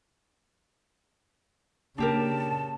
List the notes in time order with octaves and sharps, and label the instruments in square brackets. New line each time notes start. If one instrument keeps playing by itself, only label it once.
[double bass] C#3 [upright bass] A#3 [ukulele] D4 G4 A#4 [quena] A5